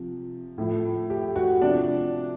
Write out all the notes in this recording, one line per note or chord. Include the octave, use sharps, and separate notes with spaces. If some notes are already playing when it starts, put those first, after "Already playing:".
Already playing: C3 F3
A2 F3
G4
F#4
C3 F3 D4